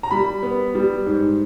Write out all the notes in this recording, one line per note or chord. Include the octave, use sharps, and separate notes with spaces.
A#5
G3 B5
B3
G3
G#2